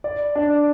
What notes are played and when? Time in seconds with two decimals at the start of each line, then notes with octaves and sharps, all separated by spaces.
0.04 D5
0.35 D4